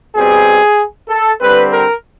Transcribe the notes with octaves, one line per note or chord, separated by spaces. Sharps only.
B2 G3 C4 G#4
A4
D3 G3 C4 B4
A#4